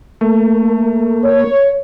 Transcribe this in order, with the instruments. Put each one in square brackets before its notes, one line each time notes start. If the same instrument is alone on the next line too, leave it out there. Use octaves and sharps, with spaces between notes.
[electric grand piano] A3 [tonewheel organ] A#3
[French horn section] C#5